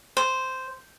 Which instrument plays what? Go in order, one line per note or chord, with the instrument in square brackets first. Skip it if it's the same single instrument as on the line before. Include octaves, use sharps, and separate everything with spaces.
[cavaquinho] C5